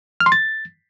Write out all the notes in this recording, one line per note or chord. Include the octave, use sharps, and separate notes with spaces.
F6
C6
A6